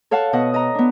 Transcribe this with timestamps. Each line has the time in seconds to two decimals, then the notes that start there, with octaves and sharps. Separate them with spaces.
0.11 A4 C#5 F5 F#5 A5
0.33 B2 D#5 F#5 D#6
0.54 D#5 A#5
0.75 B3 D4